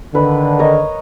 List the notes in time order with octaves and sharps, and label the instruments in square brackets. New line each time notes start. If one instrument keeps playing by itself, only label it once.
[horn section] D3 D#3 [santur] B4
[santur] A#4 C#5 D#5